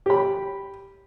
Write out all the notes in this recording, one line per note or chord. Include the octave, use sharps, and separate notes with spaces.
G4 B5